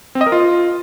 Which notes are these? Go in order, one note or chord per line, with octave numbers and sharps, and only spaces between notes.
C4
D#5
A#4
F4